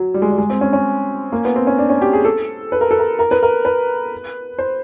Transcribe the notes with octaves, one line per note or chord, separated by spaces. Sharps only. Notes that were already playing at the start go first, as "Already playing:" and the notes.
Already playing: F#3
G3
G#3
G3
G#3
C4
C#4
C#4
A#3
B3
C4
C#4
D4
C#4
G4
G#4
A4
B4
A#4
A4
A#4
A#4
B4
A#4
B4
C5